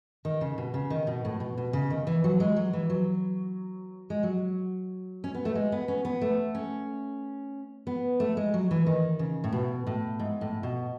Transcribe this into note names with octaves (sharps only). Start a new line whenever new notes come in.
D#3
C#3
B2
C#3
D#3
B2
A2
B2
B2
C#3
D#3
E3
F#3
G#3
F#3
E3
F#3
G#3
F#3
C#4
B3
A3
G#3
B3
C#4
B3
A3
C#4
B3
A3
G#3
F#3
E3
D#3
C#3
A2
B2
A2
G#2
A2
B2